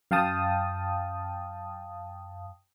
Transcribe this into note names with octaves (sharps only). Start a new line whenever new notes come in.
F#2 F5 G5 A5 D#6